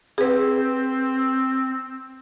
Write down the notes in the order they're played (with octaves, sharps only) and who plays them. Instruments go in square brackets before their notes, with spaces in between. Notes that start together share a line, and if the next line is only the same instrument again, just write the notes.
[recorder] C4 [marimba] G#4 B4